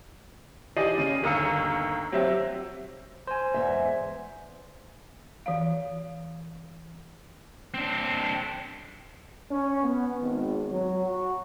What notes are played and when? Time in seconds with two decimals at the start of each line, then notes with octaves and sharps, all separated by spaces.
0.77 E3 G4 D5 D#5 C7 D#7
0.98 C#3 D#7
1.23 G1 D#2 F5 A#5 E6 C#7
2.12 F#3 C4 G4 E5
3.27 C5 G#5
3.54 E2 G#2 E5
5.46 E3 D5 F5
7.74 C4 D4
9.50 C#4
9.84 B3
10.20 G#1
10.71 F#3
11.06 F#4